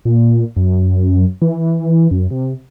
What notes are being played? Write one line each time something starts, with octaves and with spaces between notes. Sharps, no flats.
A#2
F#2
E3
F#2
C3